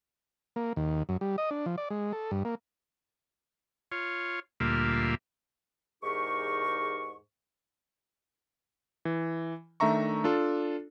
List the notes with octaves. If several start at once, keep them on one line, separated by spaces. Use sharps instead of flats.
A#3
D#2
F#2
G3
D#5
D4
F3
D5
G#3
A4
G2
A#3
F4 C#5
D2 A#2 G3 A#3 F4 E5
E2 G#2 D#4 G4 A#4 C#6
E3
D#3 A3 D4 E5 A#5 C#6
D4 F4 A4